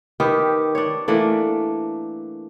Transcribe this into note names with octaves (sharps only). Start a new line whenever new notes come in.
D#3 G4 B4
D4 C#5
E3 A3 A#3 D4